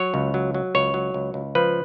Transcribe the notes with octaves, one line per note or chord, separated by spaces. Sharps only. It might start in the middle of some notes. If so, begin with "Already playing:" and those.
Already playing: F#3 C#5
C#2
F#3
F#3
C#2 C#5
F#3
C#2
C#2
F3 B4